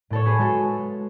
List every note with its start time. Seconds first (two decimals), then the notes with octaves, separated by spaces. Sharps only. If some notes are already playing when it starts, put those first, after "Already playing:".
0.10 A2 A4 C#5
0.26 G#4 B4
0.39 G#3 F#4 A4